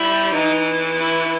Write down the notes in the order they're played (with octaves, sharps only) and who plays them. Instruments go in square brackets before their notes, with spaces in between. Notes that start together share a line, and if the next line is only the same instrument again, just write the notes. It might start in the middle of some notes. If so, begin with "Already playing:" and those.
Already playing: [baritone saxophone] G3 [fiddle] E4
[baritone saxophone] E3 [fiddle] D#4
[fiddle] E4